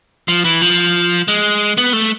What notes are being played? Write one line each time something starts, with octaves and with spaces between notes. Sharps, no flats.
F3
E3
F3
G#3
B3
A3